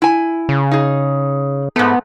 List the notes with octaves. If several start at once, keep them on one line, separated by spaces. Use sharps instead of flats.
E4 G#5
C#3
D#4 G#4
G#2 A3 B3